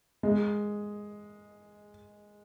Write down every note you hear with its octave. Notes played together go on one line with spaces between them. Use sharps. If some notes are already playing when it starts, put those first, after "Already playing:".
G#3